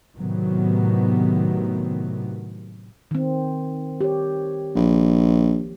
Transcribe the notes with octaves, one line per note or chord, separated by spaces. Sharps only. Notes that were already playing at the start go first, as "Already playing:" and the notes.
A2 C3 D#3 F#3 B3
D#3 C4
G4 C#5
A#1 F3 A#3